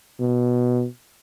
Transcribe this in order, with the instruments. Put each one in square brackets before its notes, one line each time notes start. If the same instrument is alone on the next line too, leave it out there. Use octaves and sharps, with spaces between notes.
[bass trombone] B2